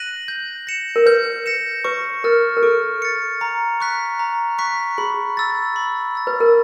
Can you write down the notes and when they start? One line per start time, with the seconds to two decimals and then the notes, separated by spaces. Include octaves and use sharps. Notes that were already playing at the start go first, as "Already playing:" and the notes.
Already playing: F#6 A#6 D#7 F#7
0.28 G6
0.67 A#6 C#7 E7
0.96 A#4
1.06 B4 G6
1.46 A#6 C#7 E7
1.84 B4 C#6
2.24 A#4 F6 A6 C#7
2.57 A#4
2.62 A4 C#6
3.02 F6 A6 C#7
3.41 A#5
3.80 C#6 F#6 B6
4.19 A#5
4.59 C#6 F#6 B6
4.98 G#4 B5
5.37 E6 A6
5.76 B5
6.15 E6 A6
6.27 B4
6.40 A#4